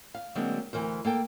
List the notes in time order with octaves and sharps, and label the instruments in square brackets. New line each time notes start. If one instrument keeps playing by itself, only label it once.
[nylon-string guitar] F5
D3 F#3 G#3 A#3 C4
D2 C#3 E3 A#4 C5
A#3 A4 G5